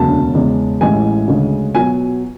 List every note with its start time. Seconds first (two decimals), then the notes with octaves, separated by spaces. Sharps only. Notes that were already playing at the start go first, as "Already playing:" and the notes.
Already playing: E1 D2 C#3 F#3 A5
0.35 E2 C#3 G#3
0.81 A1 A2 E3 G#3 G#5
1.28 D2 C#3 G#3
1.75 B2 F#3 G#5